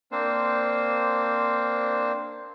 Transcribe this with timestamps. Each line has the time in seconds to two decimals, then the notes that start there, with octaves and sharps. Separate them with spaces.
0.12 A#3 C4 D4 C5